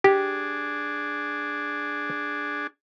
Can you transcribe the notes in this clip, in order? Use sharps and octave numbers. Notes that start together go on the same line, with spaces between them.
D4 G4 G#4